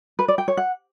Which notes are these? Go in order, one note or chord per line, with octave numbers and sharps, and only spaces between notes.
B4
D5
G5
C#5
F#5